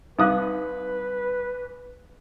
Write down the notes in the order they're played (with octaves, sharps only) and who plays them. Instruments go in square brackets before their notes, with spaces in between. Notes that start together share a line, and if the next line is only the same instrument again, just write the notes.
[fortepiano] C2 D#6 F#6 [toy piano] D#4 F5 D6 [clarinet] B4